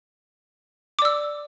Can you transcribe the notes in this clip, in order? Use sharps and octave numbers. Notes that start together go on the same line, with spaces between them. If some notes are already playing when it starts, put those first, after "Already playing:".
D5 D6 E6